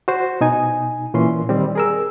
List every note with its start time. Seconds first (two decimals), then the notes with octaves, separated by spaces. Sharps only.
0.08 F#4 C5
0.41 B2 D#4 G#5
1.14 A#2 E3 C#4 C6
1.49 D#3 G3 C4
1.75 G#4 A#4 E6